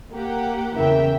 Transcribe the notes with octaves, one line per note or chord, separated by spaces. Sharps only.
A#3 G4 F#5
E2 C#3 E3 A#4 E5 G5